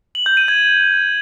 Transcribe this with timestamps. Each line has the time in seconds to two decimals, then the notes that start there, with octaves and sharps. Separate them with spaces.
0.15 F#7
0.26 G6
0.37 D#7
0.48 G#6